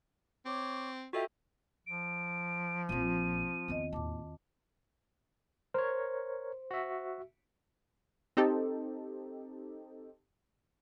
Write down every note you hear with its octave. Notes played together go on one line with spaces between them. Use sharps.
C4 C#5 C#6 D6
F4 F#4 A4 D#5 E5 G5
F3 D7
A#1 A#2 C4 F4 D#7
E2 D#3 B3 C4 D#5
D#2 A2 A5 D6
A#4 C5 C#5
F#4 E5
C4 D#4 G4 A4